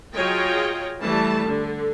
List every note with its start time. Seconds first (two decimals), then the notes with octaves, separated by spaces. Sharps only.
0.13 F#3 F4 G#4 C#5 D#5 G5
1.02 E3 G3 A3 A5
1.44 D3